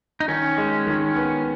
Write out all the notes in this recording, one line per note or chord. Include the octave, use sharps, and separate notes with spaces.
D#4
D#3 C#4
G#3
D#3
B3